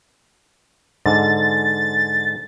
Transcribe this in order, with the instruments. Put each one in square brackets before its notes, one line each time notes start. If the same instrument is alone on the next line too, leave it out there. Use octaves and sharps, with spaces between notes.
[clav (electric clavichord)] G#2 D3 [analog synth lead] A6